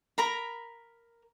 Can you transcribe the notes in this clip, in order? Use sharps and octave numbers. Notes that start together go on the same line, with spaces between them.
A#4 A#5 B5